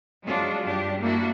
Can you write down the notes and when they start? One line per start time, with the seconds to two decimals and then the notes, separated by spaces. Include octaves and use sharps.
0.24 F#3 G#3 D4 F4 F#4
0.65 G2 D4 G4
1.00 A#3 D4 E4 F#4